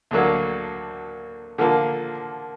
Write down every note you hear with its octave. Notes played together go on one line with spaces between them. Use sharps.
D2 D3 F#3 A#3
D3 F3 A#3